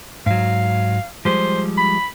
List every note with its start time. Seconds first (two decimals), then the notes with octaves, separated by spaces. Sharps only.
0.26 G#2 F#3 F5
1.25 F3 G3 G#3 C5
1.77 B5